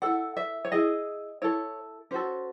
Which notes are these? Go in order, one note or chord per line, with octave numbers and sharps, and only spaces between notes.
E4 A4 F#5
E5
C#5
E4 G#4 D#5
E4 A4 C#5
C#4 F#4 A4 C5